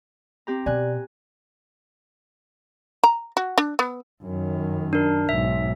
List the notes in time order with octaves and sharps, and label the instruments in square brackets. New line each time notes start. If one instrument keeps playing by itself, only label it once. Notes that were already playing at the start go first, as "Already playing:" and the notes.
[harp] C4 G4 A#5
[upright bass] B2 [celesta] D5 [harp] G#5 F#6
[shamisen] A#5
F#4
D4
B3
[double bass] F#2 D#3
[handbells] D4 A#4
[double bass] B1 G#2 [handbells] E5